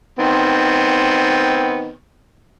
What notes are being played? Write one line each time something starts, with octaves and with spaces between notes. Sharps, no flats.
D#3 B3 C4